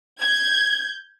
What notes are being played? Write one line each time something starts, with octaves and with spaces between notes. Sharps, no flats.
G6 G#6